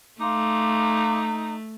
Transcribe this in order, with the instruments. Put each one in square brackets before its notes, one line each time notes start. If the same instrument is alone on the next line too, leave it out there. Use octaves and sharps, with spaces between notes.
[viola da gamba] A3 [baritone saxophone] D#4 [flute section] F5 C6 D6